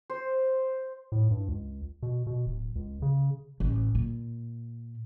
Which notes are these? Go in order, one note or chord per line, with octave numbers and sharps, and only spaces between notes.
C5
A2
G2
C#2
B2
B2
D1
C#2
C#3
A1
A#2